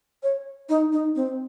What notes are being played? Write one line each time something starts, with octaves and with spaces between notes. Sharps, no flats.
C#5
D#4
D#4
C4